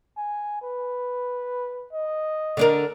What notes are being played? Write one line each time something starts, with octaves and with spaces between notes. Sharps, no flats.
G#5
B4
D#5
D3 D4 A#4